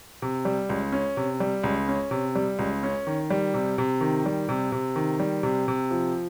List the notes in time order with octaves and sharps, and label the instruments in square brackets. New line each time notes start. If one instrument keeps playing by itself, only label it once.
[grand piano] C3
G3
C#2
C#4
C3
G3
C#2
C#4
C3
G3
C#2
C#4
D#3
G3
C3
C3
D#3
G3
C3
C3
D#3
G3
C3
C3
F3